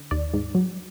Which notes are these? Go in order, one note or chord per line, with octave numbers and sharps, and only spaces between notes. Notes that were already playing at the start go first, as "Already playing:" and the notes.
Already playing: D3
D#2 D5
G#2
F#3